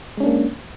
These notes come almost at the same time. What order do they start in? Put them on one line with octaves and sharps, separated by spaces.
G#3 C#4 D4 A#3